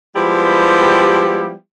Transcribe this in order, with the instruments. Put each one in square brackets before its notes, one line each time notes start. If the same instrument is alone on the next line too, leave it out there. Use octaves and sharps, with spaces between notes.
[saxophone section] F3 G3 G#3 B3 E4 G4